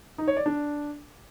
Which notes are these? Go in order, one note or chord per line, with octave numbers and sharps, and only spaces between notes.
D#4
C#5
D5
D4